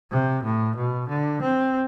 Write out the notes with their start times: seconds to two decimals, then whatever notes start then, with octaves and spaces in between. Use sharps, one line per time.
0.11 C3
0.44 A2
0.76 B2
1.09 D3
1.42 C4